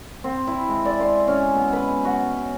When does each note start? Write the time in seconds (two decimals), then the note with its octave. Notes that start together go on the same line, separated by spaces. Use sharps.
0.24 C4
0.47 E4
0.68 G#3
0.85 D5
1.01 C6
1.28 C#4
1.55 B2
1.73 B4
2.05 F#4